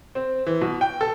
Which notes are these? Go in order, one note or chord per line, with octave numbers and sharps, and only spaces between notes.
C4
E3
B2
G5
A4